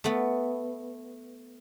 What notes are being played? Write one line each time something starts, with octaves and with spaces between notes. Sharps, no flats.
A3 B3